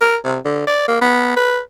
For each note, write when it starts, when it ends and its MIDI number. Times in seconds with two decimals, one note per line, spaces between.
0.01 0.17 70
0.24 0.38 48
0.45 0.66 50
0.67 0.88 74
0.88 0.98 58
1.01 1.33 59
1.37 1.59 71